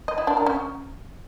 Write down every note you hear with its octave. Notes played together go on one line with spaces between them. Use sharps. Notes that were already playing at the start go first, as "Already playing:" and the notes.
D#5
E4
D4
A#4
C#4